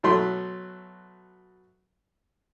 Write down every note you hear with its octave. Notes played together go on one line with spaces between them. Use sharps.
B2 F#3 A3 C6